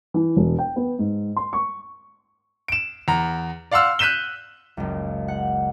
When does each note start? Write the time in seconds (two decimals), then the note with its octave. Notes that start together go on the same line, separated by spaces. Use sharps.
0.14 E3
0.37 E1
0.59 G5
0.76 B3
0.99 G#2
1.36 C6
1.53 C#6
2.68 D7 E7
3.08 E2 A#5
3.71 D5 F5 F#5 C6 E6 F6
3.99 F#6 G6 B6 D#7 E7 G7
4.77 F#1 C#2
5.28 F#5